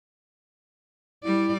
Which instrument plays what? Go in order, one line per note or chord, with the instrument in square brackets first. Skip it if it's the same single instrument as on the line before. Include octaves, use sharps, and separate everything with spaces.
[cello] G3 D5 [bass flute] E4